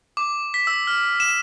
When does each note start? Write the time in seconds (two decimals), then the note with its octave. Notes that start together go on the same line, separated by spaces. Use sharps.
0.17 D6
0.54 B6
0.67 E6
0.87 F6
1.20 E7